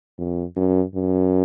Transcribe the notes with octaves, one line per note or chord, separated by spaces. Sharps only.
F2
F#2
F#2